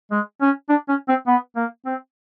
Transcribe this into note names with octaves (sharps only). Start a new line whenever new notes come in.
G#3
C#4
D4
C#4
C4
B3
A#3
C4